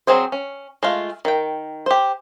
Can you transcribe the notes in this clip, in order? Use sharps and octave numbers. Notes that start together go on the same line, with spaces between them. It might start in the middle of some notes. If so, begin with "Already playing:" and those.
F#3 A3 C4 G#4 C5
C#4
G#3 A3 F4
D#3 G5
G4 C5